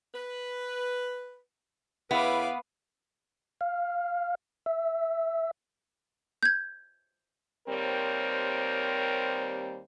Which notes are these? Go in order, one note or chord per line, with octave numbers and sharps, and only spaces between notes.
B4
C#3 B3 E4 B4 F5 D6
F5
E5
G6 G#6
D#2 G3 C4 A#4 C5 C#5